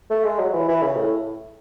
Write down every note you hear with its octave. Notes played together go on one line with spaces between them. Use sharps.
A3
G#3
F#3
F#3
E3
E3
C#3
A2